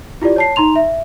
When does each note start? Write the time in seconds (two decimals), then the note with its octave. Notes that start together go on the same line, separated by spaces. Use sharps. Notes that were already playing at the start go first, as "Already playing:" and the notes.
0.22 E4 F4 G4 D5
0.36 C#5 A5 C7
0.56 D#4 A#5 C6 F7
0.76 E5